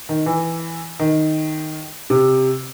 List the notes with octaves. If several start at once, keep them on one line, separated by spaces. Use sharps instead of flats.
D#3
E3
D#3
C3